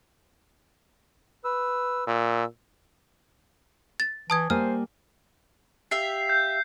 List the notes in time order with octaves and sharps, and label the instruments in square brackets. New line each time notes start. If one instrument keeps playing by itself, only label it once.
[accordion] B4 E6
[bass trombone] A#2 [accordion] E6
[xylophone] A6
[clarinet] E3 [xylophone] A5 D#6 G#6
[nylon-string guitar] G3 A#3 G#5 [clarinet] C5 [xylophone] F6
[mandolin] G4 E5 F5 [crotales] C7
[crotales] G6